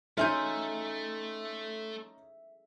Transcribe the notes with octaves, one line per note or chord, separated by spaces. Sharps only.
A3 C#4 D#4 F4 E5 G#5 G6